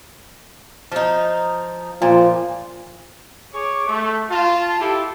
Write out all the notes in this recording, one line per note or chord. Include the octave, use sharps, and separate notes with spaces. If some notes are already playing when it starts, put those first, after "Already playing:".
F3 D#4
A#2 F3
G#4 C#5 C#6 D6
A3
F4 A5
E4 G4 A4